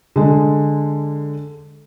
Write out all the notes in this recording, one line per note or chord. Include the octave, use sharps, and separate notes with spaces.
D3 G#3